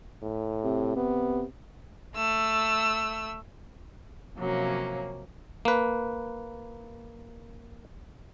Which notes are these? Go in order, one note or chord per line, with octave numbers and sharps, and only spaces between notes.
A2
C3
C3 B3
A3 E6
C3 F3 F#3 A#3 C#4
A#3 B4